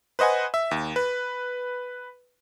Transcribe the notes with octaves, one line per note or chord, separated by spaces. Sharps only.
B4 C5 D#5 F#5 G#5
E5
D#2
B4